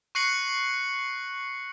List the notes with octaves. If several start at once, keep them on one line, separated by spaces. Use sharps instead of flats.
C#6 F#6 A#6 C7 C#7 F#7